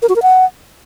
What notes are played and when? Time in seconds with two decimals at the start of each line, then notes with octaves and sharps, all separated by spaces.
0.02 A#4
0.09 F#4
0.16 A#4
0.23 F#5